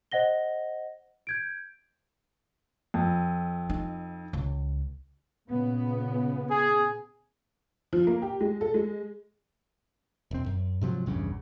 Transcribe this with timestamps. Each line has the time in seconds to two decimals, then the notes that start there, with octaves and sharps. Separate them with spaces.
0.12 C5 D#5 F#5 A#6 G7
1.27 G6 G#6 D7
2.94 F2
3.70 D#4
4.33 C#2
5.50 A#2 C#3 B3
6.49 G#4
7.93 F3
8.07 A#3
8.22 G4
8.41 G#3
8.61 A4
8.74 G#3
10.31 E1 C4
10.46 F#2
10.81 G#2 C3 F3 F#3
11.06 A#1 E2 G2 C#3